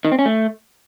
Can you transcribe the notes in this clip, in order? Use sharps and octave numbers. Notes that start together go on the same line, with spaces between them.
D#3
C4
C#4
A3